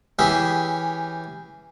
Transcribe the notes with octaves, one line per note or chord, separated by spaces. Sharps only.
E3 C#4 G4 G#4 E5